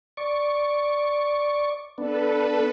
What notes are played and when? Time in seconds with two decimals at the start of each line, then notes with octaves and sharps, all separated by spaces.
0.17 D5 C#6
1.98 B3 D4 A4 B4